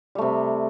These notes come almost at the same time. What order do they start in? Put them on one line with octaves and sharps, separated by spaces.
G3 A3 C3